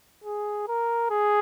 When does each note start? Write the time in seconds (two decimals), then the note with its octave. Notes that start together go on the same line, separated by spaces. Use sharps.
0.24 G#4
0.68 A#4
1.11 G#4